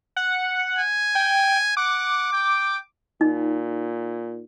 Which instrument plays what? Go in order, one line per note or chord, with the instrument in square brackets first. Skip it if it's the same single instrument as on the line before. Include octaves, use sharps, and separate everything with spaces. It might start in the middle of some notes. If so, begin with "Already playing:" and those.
[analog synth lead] F#5
[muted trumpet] G#5
[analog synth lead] G5
[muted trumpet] F#5 [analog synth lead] D6
[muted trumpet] G5
[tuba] A#2 [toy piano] D#4